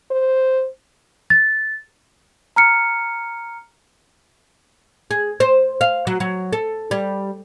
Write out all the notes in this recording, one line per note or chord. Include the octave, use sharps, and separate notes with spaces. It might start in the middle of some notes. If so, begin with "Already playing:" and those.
C5
A6
A#5 F6 C#7
G#4
C5
F5
F#3
F#3
A4
G3